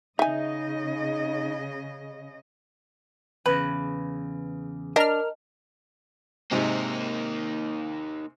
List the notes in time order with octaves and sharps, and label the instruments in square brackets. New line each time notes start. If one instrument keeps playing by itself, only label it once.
[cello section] C#3 D#5 [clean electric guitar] D#4 [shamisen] E5 G#5
[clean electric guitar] E2 C#3 [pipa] B4
[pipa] D4 [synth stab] A#4 F6 [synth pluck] D#5
[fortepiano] G#2 C3 [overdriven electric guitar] A#3 D#4